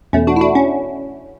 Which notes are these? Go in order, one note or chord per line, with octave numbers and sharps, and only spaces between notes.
E2 B2 A3 C#4
D4 F#4
E4
D4 F#4
C#4